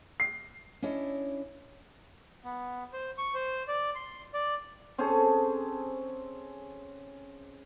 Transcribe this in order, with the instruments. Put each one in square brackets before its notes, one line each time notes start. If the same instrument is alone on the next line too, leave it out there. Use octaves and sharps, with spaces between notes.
[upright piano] C7
[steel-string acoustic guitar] C#4 D4 E4 C#5 D#5
[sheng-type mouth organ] B3
C5
C#6
C5
D5
C6
D5
[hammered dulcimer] C4 C#4 G#4 A4